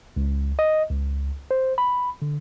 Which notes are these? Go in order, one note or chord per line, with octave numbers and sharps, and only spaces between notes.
C#2
D#5
C#2
C5
B5
D3